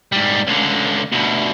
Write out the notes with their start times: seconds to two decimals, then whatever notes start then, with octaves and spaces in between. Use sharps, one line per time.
0.12 G#2 G3
0.47 C#2 D3
1.13 D2 B2